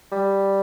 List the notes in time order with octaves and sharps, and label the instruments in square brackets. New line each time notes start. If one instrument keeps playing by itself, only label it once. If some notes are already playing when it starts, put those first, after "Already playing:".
[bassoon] G3